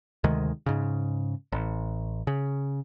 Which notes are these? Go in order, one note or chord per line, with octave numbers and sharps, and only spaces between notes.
D2 C3 D#3 G#3
G#2 C#3
A1
C#3